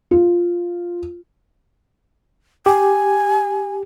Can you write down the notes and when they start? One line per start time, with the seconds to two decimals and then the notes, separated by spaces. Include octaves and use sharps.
0.11 F4
2.66 G4 G#5